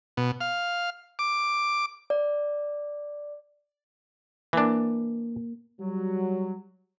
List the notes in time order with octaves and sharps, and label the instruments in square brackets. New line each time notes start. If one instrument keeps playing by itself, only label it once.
[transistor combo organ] B2
F5
D6
[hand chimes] D5
[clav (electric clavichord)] E3 D4 [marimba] A#3 A#4
[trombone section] F#3 [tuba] G3